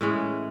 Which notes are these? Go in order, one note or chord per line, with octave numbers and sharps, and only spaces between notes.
A2 E3 G#3 C#4